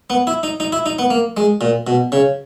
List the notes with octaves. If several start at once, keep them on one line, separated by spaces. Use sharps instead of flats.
B3
E4
D#4
D#4
E4
D#4
B3
A#3
G#3
A#2
B2
C#3